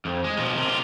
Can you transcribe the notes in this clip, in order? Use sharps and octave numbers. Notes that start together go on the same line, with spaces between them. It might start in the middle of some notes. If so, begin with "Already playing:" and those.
F2
G#3
B1 F3
C3 D#3
C3 F4